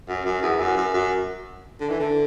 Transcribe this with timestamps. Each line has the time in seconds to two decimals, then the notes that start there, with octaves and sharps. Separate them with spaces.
0.08 F#2
0.25 F#2
0.42 E2
0.59 F#2
0.77 F#2
0.94 F#2
1.81 D3
1.90 E3
2.00 D3